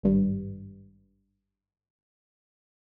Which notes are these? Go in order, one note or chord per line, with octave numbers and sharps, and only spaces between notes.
G#1 G2